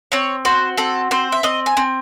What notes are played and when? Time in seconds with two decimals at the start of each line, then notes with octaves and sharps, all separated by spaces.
0.12 C4 C#5
0.45 F#4 C5
0.77 C4 A4
1.11 C4 C5
1.32 E5
1.43 C4 D#5
1.66 G#5
1.77 C4